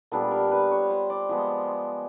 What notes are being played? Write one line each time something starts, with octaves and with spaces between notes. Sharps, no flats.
A#2 G3 B3 D4 A4
A#4
B4
C#5
C5
D5
F3 G#3 B3 C5